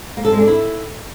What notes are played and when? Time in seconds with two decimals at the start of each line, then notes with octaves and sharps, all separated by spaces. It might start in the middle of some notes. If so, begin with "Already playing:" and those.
0.17 A#3
0.25 A4
0.32 G#3
0.40 D4
0.47 E4